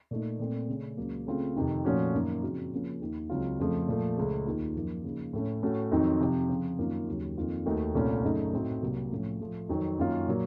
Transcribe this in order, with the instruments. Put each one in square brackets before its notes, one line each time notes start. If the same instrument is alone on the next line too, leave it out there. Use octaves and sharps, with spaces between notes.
[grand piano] A#2 A3 D#4
A#2 A3 C4
C#3 A3 C#4
C#2 C#3 F#3 A#3
C#3 A3 C4 F4
F2 C3 D#3
A#2 F3 A3 C#4 F#4
F#2 D#3 A#3
C#3 F3 C4 D#4 F#4
C#3 F3 A#3 C#4 F4
D#2 D#3 A#3
C#2 C#3 F#3 C4 F4
F2 C#3 F3 A3
A#2 F3 A3
C#2 C#3 A3
D#2 D#3 A#3 F4
F#2 F3 A#3 D#4
C#3 F3 A#3 D#4
A2 A3 C#4
A2 A3 C#4 F#4
F2 D#3 F#3 C4 D#4
C3 F3 C4
C#3 F3 C4
F#2 D#3 A#3 F4
D#2 C#3 F#3
F2 D#3 A#3 F4
D#2 D#3 A3 D#4 F#4
C2 A#2 A3 C#4 F4
F#2 C#3 A3 D#4
A2 A3 C4 D#4 F#4
C2 C3 F#3 A#3
A2 F3 A3 C#4 F4
A2 F3 A3
F2 D#3 F#3 C4
F#2 D#3 A#3 C#4 F4
A#2 F#3 A#3